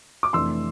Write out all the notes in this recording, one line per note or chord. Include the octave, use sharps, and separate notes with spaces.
D6
F1 F2 E3 A3 D4 C6 E6